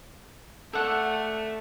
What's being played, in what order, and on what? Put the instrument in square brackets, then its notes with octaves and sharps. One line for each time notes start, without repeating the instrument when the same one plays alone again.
[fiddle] A3 [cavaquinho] A4 D5 F#5